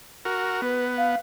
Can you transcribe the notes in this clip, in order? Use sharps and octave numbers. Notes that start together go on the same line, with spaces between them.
F#4 A#4
B3 B4
F5